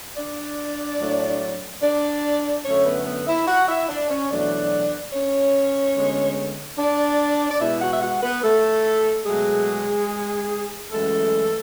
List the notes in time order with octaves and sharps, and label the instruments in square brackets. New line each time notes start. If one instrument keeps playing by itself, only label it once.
[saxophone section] D4 D5
A2 F#3 A3
D4 D5
F#2 D3 A3 C#4 C#5
B3 B4
B3 B4
E4 E5
F#4 F#5
E4 E5
D4 D5
C#4 C#5
E2 B2 F#3 A3 D4 D5
C#4 C#5
D2 D3 G#3 B3
D4 D5
D5
B2 G#3 B3 E4 E5
F#4 F#5
E5
F#4 F#5
B3 B4
A3 A4
B2 F#3 G#3 A3 G#4
F#2 E3 G#3 A3 A4